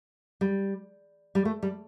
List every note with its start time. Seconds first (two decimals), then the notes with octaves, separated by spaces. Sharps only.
0.41 G3
1.35 G3
1.45 A3
1.63 G3